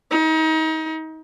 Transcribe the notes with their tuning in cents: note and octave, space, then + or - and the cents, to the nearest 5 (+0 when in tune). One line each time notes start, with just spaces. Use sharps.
D#4 +30